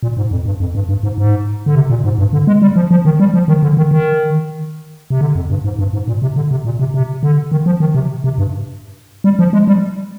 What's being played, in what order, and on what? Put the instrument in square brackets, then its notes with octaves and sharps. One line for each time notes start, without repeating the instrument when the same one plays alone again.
[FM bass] A#2
G#2
F2
G2
F2
G2
G2
G#2
G#2
D3
C3
A#2
G#2
G2
D3
G#3
G3
F3
F3
D#3
G3
F3
D#3
D3
D#3
D#3
C3
D3
F2
G2
G#2
G2
G#2
A#2
C3
D3
C3
A#2
C3
C3
D3
D#3
F3
D#3
C3
C3
G2
G3
F3
G#3
G3